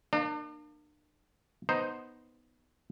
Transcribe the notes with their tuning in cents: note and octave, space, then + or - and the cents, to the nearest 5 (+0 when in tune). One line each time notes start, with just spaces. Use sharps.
A#3 +0 D4 +40
B3 +0 D#4 +0 C5 +0